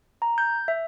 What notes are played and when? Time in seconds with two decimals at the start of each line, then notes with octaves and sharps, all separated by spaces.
0.22 A#5
0.38 G6
0.68 E5